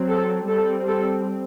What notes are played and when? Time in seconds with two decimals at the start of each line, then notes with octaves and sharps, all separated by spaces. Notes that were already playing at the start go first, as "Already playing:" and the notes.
Already playing: F#3 C4
0.08 A4
0.48 G3 C4 A4
0.89 A4